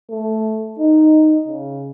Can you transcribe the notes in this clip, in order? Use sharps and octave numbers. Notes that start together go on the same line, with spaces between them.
A3
D#4
C#3